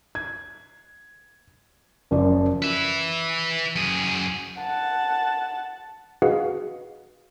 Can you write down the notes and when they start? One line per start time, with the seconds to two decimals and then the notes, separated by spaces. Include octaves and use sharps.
0.15 G#6
2.11 F#1 F#2 F3 D5
2.62 B4 E5
3.76 F#2 G#4
4.60 F#5 A5
6.22 F#4 G#4 B4 D#5 F5 F#5